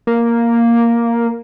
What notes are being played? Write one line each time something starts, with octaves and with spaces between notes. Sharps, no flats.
A#3